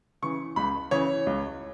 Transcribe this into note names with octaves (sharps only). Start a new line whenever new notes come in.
C#3 E3 C#6
C#2 B5
C#3 E3 C#5
C#2